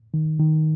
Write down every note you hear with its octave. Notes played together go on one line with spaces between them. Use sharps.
D#3
D#3